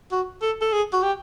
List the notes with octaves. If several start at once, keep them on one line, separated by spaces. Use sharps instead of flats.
F#4
A4
A4
G#4
F#4
G4